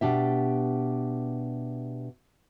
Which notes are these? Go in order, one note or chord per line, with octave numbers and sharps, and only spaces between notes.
B2 D4 G4 E5